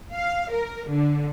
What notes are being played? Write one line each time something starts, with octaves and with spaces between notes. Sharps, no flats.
F5
A#4
D3